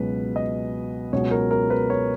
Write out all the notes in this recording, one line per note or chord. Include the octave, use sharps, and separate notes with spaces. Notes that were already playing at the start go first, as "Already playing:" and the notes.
Already playing: C#2 B2 F#3 B4
D#5
C#2 B2 F#3 C#5
A#4
A#4
B4
C#5